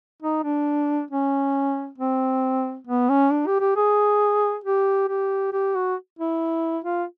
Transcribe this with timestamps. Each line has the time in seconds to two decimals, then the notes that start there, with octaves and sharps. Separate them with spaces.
0.22 D#4
0.44 D4
1.11 C#4
1.98 C4
2.87 B3
3.09 C#4
3.31 D4
3.47 G4
3.60 G4
3.76 G#4
4.64 G4
5.09 G4
5.53 G4
5.75 F#4
6.19 E4
6.85 F4